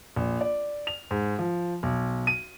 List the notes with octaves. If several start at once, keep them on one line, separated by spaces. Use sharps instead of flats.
A#1
D5
F7
G#2
F3
B1
D#7